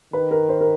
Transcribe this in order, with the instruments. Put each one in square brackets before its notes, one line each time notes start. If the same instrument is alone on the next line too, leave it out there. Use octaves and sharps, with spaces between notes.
[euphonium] D#3 [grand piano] B4
[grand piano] A#4
C5
A#4